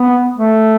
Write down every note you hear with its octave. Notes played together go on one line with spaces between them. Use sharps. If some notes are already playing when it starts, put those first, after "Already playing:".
Already playing: B3
A3